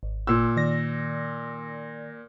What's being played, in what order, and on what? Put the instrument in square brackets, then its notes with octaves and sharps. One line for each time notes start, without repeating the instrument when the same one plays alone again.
[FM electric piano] G#1
[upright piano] A#2 E6
[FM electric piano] D#3 D5 A#6